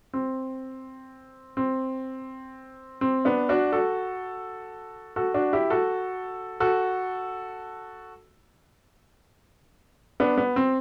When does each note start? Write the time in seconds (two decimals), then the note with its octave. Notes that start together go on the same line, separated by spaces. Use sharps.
0.14 C4
1.57 C4
3.01 C4
3.25 B3 D4
3.49 D4 F#4
3.72 F#4 A4
5.16 F#4 A4
5.34 D4 F#4
5.53 E4 G4
5.70 F#4 A4
6.60 F#4 A4
10.20 B3 D4
10.37 B3
10.56 C4